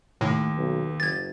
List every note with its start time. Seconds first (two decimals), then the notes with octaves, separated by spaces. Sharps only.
0.21 D#2 A2 A3
0.57 B1
1.00 F#1 G#6 A6